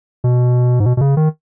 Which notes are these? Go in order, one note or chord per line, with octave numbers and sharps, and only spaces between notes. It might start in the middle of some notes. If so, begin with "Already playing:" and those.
B2
G#2
B2
B2
C#3
D#3